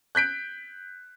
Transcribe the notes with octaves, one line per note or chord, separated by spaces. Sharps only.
F#6 G6 B6 D7